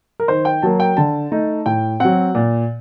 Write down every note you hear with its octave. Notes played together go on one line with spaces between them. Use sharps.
A#4
D#3 C5
G5
F#3 A#3 A5
G5
D3 A5
A3 D#4
A2 G5
F#3 C4 F#5
A#2